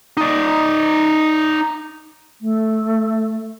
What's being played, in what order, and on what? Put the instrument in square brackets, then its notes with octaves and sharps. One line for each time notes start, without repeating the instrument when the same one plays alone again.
[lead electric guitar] D#4 D5
[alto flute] A3